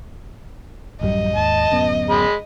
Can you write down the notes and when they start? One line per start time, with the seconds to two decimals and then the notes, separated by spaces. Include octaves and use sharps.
1.01 A1 F#2 G3 D#5
1.36 D#2 G#2 A5
1.70 D1 F#2 B3
2.10 G#3 B5